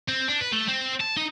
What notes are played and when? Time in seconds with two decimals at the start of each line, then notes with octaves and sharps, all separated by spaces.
0.08 C4
0.28 D4
0.41 B4
0.53 A3
0.68 C4
1.01 A5
1.17 D#4